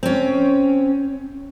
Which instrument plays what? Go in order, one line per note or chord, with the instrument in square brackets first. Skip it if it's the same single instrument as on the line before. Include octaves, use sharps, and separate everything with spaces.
[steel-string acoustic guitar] C4 C#4